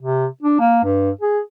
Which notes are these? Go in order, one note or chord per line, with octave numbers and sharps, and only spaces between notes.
C3
D4
A#3
G2
G#4